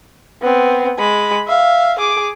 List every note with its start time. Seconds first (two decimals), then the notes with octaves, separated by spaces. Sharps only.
0.42 B3 C4
0.99 G#3 B5
1.48 E5 F5
1.99 G#4 D6